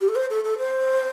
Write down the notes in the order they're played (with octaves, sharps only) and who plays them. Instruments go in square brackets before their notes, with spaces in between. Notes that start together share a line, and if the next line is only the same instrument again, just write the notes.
[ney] G4
A4
C5
A4
A4
C5